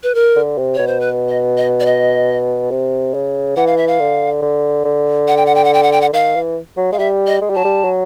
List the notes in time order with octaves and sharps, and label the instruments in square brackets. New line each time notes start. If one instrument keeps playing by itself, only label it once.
[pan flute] B4
A#4
[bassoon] D3
C3
[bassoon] B2 [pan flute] C#5
[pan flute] C5
B4
D#5
D#5
D5
D#5
[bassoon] C3
C#3
[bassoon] E3 [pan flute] F#5
[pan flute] F5
E5
F5
[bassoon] D3
D3
D3
[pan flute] F#5
G5
F#5
G5
F#5
G5
F#5
G5
F#5
[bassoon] D#3 [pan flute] F5
[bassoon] E3
F#3
[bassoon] G#3 [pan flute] F5
[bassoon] G3 [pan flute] E5
[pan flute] D#5
[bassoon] G#3
G3
[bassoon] F#3 [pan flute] A5
[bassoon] G3
F#3